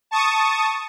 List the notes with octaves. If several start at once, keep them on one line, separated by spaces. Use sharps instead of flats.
A5 C#6 D#6